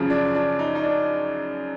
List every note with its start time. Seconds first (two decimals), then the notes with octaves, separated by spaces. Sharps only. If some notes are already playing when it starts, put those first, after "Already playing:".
Already playing: F#2 C#3 F3
0.10 D4
0.34 D4
0.59 D#4
0.75 D#4
0.83 D4